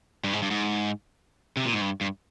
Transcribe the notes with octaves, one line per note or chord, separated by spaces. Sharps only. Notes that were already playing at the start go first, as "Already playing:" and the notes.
G2
G#2
G2
G#2
C3
A#2
G#2
G2
G2